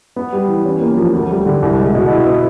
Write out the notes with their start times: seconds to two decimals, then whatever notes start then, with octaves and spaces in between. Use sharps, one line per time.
0.16 B3
0.32 G3
0.48 E3
0.65 C#4
0.81 A#3
0.97 F3
1.13 D2
1.30 G3
1.46 D3
1.62 C2
1.78 G#3
1.95 B2
2.10 E4
2.26 B3